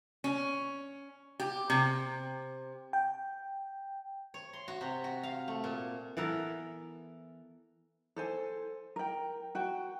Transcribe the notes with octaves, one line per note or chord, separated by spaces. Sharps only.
C#4
G4
C3
G5
C#5
C6
F#4
C3
F#4
F5
A3
A#2
E3 B3 A4 A#4
A4 C5 G#5
A#4 G5
F#4 G5